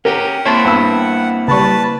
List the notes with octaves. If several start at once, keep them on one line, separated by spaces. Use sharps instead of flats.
C#4 G4 A#4 F#5
A#3 C4 E4 C#5 A5 C6
G2 B3 E6
C#3 G3 B4 A5 B5 C#6